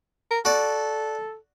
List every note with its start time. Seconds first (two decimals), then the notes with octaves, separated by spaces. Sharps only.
0.31 A#4
0.45 F#4 A4 D5